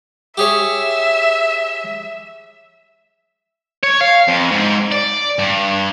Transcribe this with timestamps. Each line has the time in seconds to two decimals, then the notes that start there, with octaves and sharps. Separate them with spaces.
0.38 G4 G#4 C#5 E5
3.84 C#5
4.01 F5
4.28 F2
4.51 G#2
4.92 D5
5.39 G2